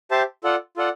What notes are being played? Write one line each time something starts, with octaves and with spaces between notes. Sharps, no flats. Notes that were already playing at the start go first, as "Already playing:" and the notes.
G4 C5 E5 A5
F4 A4 D5 F#5
F4 A4 D5 F#5